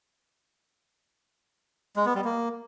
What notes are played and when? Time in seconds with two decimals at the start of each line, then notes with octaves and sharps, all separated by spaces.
1.96 G#3
2.06 B3
2.15 G3
2.24 A#3